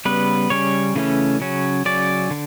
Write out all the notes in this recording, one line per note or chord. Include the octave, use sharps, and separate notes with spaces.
C#3 G3 B3 B4
C#3 G3 C#4 C#5
C#3 E3 A3 C#4
C#3 F#3 C#4
C#3 F#3 C#4 D5
D3